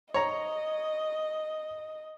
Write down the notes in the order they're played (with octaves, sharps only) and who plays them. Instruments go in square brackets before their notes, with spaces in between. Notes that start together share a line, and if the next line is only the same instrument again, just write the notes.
[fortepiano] C#5 A#5 [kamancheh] D#5